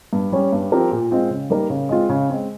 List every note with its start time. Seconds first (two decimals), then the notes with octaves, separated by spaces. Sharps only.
0.13 G2
0.32 G3 C#4
0.53 G2
0.72 F3 C4 G4 A#4
0.91 A#2
1.11 G#3 C4 F4
1.30 C#3
1.50 G3 A#3 D#4 A#4
1.70 C#3
1.89 G#3 C4 F4
2.09 C#3
2.29 G#3 C4